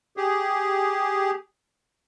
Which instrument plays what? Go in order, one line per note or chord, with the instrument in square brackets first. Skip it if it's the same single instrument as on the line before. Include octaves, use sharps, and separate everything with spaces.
[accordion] G4 G#4